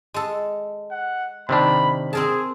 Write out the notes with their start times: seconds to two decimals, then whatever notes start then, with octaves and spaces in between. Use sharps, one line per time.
0.14 G#3 A4
0.91 F#5
1.49 C3 D#3 D4 B5
2.13 C4 G#4 A#4 A5